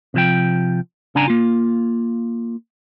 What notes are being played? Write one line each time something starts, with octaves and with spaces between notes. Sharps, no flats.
C3 F3 G5
C#3 D4 F#5 G#5 A#5
A#3 F4